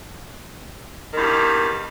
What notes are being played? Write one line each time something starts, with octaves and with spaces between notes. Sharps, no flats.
E2 G2 D#3